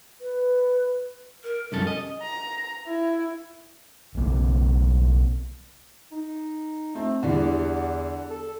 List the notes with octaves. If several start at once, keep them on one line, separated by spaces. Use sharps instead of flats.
B4
A#4
C2 F#2 C#4 A4
D#5
A#5
E4
B1 C#3 A#3 C4
D#4
A3 C4
E2 D3 E3 G3
A4